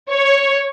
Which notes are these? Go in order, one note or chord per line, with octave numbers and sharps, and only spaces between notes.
C#5